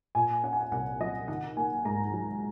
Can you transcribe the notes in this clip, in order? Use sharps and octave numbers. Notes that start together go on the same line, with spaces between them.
A#2 G#5
C#4 F#5
G#5
F#5
C2 F#5
F#3 D#5
D#3 F#5
A#3 G#5
G#2 A#5
F#3